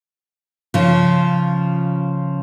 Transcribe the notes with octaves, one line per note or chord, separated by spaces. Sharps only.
C#3 F3